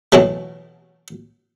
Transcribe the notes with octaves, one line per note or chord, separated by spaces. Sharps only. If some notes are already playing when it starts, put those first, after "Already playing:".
B2 E3 F#3 A3